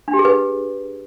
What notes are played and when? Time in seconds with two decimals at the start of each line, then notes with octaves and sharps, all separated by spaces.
0.08 D4
0.13 G4
0.19 G#4
0.25 B4